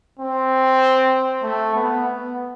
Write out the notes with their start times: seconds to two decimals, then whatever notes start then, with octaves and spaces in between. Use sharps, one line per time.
0.19 C4
1.43 A3
1.75 B3
2.05 B3